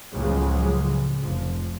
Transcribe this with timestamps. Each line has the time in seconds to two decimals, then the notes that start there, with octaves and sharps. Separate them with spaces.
0.14 C#2 A2 C#3 F3 F#3 G#3
1.19 F1 F3